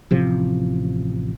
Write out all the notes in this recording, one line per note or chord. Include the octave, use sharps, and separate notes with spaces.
A1 C3 F3